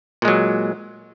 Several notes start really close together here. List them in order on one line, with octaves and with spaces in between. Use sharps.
A#2 G#3 F#3